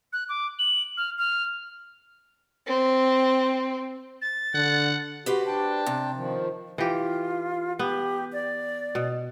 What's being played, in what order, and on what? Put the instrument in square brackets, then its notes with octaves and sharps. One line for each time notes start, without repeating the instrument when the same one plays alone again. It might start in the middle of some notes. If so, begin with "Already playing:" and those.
[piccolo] F#6
D6
F#7
F6
F6
[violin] C4
[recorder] A6
[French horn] D3 [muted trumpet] F#5
[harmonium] F#4 [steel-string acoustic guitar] G4 B4 C5
[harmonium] D4 G5 A5
[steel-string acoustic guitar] C3
[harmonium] D#3 F3
[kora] E3 G4 [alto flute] F4
[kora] B3 [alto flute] G4
[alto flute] D5
[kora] B2